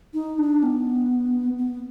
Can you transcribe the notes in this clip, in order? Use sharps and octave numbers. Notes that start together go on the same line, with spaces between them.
D#4
D4
B3
B3